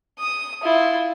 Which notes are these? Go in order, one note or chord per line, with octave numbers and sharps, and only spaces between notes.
D#6
E4 F4